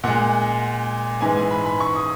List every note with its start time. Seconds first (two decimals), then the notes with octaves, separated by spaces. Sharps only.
0.04 A#2 G#3 F#5
1.21 G#2 E3 G#3 G#5
1.37 G#5
1.51 B5
1.65 B5
1.80 C#6
1.95 D#6